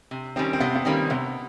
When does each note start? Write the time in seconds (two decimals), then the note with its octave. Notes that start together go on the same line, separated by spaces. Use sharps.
0.11 C3
0.36 D#3 G3 A#3 C4 C#4
0.53 C4
0.60 C3 B3
0.76 B3
0.85 D#3 G3 A#3 C4 C#4
1.10 C3 B3